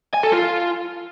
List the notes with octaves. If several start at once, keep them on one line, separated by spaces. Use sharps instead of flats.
G#5
A4
F4